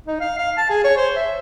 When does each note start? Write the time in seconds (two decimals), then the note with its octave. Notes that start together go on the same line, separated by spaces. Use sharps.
0.07 D#4
0.20 F5
0.39 F5
0.57 A5
0.70 G#4
0.84 C#5
0.97 C5
1.16 E5